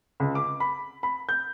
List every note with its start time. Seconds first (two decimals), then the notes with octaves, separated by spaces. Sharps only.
0.20 C#2
0.35 D6
0.60 B5
1.03 B5
1.29 G6